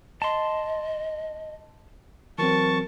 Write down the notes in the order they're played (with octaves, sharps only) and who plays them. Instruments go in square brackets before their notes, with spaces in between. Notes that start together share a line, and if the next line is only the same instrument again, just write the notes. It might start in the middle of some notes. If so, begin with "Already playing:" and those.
[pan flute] D#5 [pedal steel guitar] A5 C6
[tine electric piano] E3 F#3 C4 [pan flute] A#4 [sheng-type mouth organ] A5 C#6